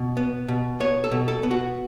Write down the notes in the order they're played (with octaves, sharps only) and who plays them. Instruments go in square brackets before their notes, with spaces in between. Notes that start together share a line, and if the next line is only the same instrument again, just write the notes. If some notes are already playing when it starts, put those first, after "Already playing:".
Already playing: [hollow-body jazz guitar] B2
B3
B2
B3 C#5
A4
B2
A4
B3
F#4